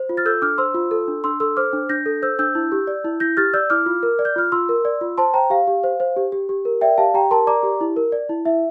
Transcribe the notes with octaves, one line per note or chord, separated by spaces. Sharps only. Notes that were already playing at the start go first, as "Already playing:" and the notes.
Already playing: C5
F4
F6 A6
A4 E6 G6
D4 D6 F6
C5 C6 E6
F4
A4
D4
D4 C6 E6
A4 C6 E6
C5 D6 F6
D4
D4 G6 A#6
A4
C5 E6 G6
D4 E6 G6
E4
G4
D5
E4
E4 G6 A#6
G4 F6 A6
D5 E6 G6
E4 D6 F6
F4
A#4
D5
G6
F4 F6
F4 C6 E6
A#4
D5
F4
C5 A5 C6
C5 G5 A#5
G4 F5
G4
C5
C5
G4
G4
G4
A#4
D5 E5 G5
G4 F5 A5
G4 G5 A#5
A#4 A5 C6
D5 A#5 D6
G4
E4
A#4
D5
E4
E4 E5